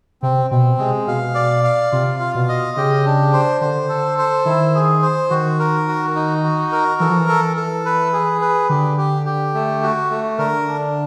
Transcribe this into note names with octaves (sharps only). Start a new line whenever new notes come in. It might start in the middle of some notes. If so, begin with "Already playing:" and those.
C3 C4
B2 C4
C3 G#3
B2 F5
D5
F5
C3 F4
F4
B2
D#5
C#3 G4
D4
C5
D3 C5
A4
C5
D#3 E4
G#4
C5
D#3 F#4
A#4
F#4
D#4
F#4
A#4
E3 A4
F3
E3
A4
A4
B4
G#4
B4
D3 G4
G4
G4
A3
F#4
A3
D3 A#4
D4